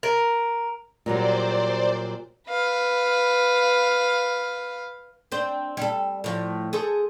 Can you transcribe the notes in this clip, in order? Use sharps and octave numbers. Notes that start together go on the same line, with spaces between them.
A#4
A#2 F#3 G3 C5 D5
B4 F5
C4 D4 C5
G3 A4
A2 F3
G#4 A4 C5